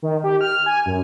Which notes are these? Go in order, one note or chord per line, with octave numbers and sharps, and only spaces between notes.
D#3
G4
F6
G#5
F#2